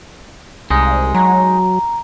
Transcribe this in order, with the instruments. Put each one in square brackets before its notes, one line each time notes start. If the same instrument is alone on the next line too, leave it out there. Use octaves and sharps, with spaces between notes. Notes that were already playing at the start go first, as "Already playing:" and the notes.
[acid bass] C2 [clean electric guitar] G#3 D#4
[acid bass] F#3 [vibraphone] A#5